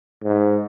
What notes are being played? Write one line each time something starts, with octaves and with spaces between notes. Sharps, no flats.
G#2